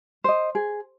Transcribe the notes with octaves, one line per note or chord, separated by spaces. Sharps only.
C5 D#5
G#4